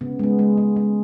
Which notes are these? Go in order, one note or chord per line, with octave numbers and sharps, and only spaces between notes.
C#3 B3
G#3 B3
G#3
G#3
G#3